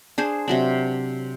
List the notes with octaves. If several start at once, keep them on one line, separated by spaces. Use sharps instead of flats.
D4 G#4 C5
C3 F#3 D4